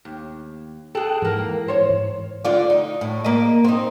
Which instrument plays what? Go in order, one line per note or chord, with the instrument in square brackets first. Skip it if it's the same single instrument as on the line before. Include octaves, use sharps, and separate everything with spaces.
[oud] D#2
[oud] G#4 A4 [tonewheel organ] G5 F#6
[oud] E2 A#3 [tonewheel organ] G#2 E3
[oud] C5 C#5
D3 F4 D5
D#4
A2
A#3 D#5
C4 D#4